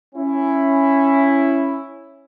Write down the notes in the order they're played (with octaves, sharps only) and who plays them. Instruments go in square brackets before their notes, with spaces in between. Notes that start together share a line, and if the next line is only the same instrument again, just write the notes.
[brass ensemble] C#4 E4